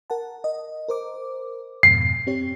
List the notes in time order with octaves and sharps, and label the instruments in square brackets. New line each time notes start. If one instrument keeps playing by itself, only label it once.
[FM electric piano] A#4 F#5 A5
D#5
A#4 C5 D6
[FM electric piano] F2 G#2 B2 [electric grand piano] C7
[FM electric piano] C4 G4 C#5